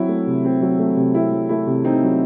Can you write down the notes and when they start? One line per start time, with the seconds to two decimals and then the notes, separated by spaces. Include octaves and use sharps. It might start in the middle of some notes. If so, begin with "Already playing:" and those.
Already playing: F#3 C4 E4
0.09 A3
0.27 C3
0.45 C4
0.62 F#3
0.79 A3
0.96 C3
1.15 C4 E4
1.32 F#3
1.49 A3 E4
1.67 C3
1.84 C4 D#4
2.03 F#3